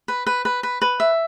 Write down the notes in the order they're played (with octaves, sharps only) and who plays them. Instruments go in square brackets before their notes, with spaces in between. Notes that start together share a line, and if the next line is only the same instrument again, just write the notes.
[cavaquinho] B4
B4
B4
B4
B4
E5